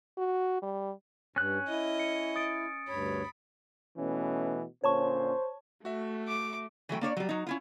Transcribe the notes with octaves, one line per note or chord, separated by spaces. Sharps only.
F#4
G3
G2 C#4 F#6
E4 D#5
C#7
D#6 A6 D7
D2 G2 C#5 B5
B2 E3 A3 C#4
A#2 D3 C#4 C5 C#5 A5 C#6
A3 F#4 E5
D6
E3 F#3 A3 G5
A#3 D4 C#5 D5
F#3 G3
F#3 D#4
C#4 E4 F4